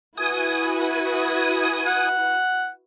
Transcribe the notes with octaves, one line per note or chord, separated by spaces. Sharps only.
E4 F#4 B4 G#5 D#6
F#5